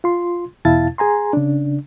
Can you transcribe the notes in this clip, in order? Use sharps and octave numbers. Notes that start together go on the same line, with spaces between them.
F4 C6
E2 B2 E4 F5 A5 A6
G#4 G#5 A#5 C6
C#3 D4